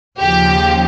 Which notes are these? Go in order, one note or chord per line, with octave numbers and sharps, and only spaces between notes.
D#2 C#3 F3 G4